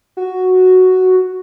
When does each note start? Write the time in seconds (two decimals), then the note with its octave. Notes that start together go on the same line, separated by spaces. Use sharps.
0.17 F#4